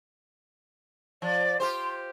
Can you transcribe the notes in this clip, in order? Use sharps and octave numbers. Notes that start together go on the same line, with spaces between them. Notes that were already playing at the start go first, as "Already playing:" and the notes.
F3 D5
F4 G4 C5 C6